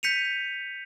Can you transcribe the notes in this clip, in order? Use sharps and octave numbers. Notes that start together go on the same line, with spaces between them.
G6 B6 C#7 D#7 F7